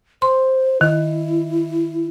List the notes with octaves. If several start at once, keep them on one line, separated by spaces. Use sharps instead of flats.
C5 C6
D#3 E4